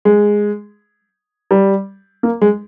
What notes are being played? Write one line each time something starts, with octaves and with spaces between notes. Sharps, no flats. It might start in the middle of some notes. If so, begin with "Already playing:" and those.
G#3
G3
A#3
G#3